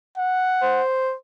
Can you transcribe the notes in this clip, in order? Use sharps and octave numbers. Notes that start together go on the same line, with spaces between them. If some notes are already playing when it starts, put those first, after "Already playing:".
F#5
C5